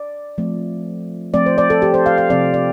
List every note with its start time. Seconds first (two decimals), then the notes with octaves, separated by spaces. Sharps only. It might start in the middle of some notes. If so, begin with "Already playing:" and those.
Already playing: D5
0.38 F3 A3 C4
1.34 F3 A3 C4 D5
1.46 C5
1.58 D5
1.70 A4
1.82 G4
1.94 C5
2.06 F5
2.18 F5
2.30 C3 F3 C4 D5
2.54 D5